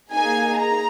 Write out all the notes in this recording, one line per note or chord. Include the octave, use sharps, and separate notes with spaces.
A#3 D#4 G#4 G#5
A#5